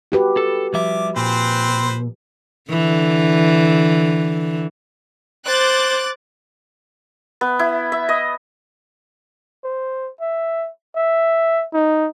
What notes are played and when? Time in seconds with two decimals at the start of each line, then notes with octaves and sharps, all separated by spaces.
0.12 F#4 G4 B4
0.37 A4
0.74 F3 G3 E5 D6
1.16 A#2 C4 B4 C5
2.70 D3 E3
5.47 C5 D6 F#6 A6
7.41 B3
7.59 E4
7.92 E5
8.09 D#5
9.64 C5
10.20 E5
10.96 E5
11.73 D#4